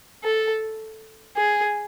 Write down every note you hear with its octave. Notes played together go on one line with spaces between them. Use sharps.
A4
G#4